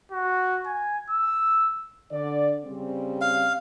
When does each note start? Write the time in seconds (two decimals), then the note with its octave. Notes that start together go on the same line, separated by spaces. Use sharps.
0.12 F#4
0.66 G#5
1.10 E6
2.10 D3 D5
2.64 C#3 G3 C4
3.21 F5